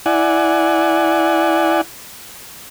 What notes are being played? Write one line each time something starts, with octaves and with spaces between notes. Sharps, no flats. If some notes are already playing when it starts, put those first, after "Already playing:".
E4 D5 F#5 G#5